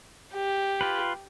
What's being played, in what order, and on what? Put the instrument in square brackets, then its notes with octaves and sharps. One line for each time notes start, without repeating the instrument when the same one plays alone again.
[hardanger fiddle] G4
[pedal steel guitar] F4 B4